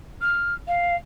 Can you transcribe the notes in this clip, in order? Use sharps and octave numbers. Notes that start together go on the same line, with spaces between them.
F6
F5